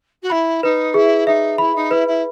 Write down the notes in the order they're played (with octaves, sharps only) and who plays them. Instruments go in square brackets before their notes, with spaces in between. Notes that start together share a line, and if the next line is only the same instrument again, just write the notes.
[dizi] F#4
[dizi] E4 [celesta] B5
[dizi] D#4 [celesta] B4
[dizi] E4 [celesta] G#4
[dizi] D#4 [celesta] E5
[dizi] E4 [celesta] B5
[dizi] D#4
[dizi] E4 [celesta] B4
[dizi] E4